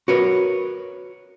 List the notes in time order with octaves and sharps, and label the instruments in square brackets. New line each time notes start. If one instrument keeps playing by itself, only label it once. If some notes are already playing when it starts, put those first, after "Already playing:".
[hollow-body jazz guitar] F#4 A#4 B4 C#5